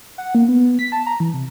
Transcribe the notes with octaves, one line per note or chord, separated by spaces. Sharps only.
F#5
A#3
B3
B6
A5
A#5
E3
C3